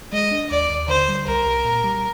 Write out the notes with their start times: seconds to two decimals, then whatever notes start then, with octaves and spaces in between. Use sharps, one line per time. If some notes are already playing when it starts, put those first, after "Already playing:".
0.13 G#3 D#5
0.31 D4
0.50 D#2 D5
0.70 D#2
0.88 D3 C5
1.08 G3
1.27 C2 A#4
1.46 C2
1.65 A#2
1.84 G3